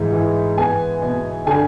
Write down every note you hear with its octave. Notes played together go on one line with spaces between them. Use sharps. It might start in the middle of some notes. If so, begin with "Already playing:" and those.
Already playing: G#2 E3
E3
B3 G#5
B2
D3 G#5